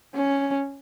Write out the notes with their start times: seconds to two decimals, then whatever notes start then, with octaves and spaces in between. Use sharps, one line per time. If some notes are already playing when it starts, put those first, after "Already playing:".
0.15 C#4